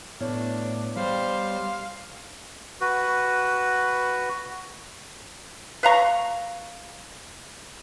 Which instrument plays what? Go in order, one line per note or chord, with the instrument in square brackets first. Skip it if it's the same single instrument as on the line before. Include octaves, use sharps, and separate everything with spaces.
[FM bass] A2 [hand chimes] B3 C#5 [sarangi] D4
[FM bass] G3 [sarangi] C5 [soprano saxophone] F5
[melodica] F#4 B4
[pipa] B4 F5 A#5 C#6